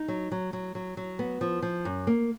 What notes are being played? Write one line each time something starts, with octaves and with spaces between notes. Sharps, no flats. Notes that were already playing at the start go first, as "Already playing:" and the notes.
Already playing: D#4
F#3
F#3
F#3
F#3
F#3
B3
F3
F3
F#2
A#3